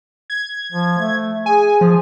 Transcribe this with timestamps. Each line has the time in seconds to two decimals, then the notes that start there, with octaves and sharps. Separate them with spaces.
0.30 G#6
0.72 F3
0.98 A3
1.46 G#4 G#5
1.81 F3